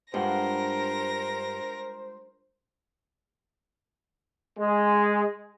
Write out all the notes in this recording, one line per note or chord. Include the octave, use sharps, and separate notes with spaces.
G2 G#3 F4 A#4 C5 F#5 A#6
G#3